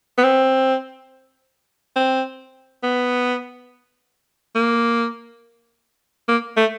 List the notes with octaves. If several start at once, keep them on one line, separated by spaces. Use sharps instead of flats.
B3
C4
C4
B3
A#3
A#3
A3